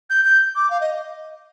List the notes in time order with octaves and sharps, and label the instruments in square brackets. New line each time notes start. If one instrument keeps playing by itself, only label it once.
[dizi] G6
G6
D6
F5
D#5